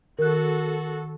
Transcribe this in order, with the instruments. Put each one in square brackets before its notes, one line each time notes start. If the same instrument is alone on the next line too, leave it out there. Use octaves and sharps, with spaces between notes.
[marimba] D#3 F#6 [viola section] F#4 A4 [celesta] A#4